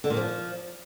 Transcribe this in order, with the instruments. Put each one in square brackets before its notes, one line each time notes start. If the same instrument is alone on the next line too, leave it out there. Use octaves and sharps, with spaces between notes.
[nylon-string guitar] D3
A#2
F3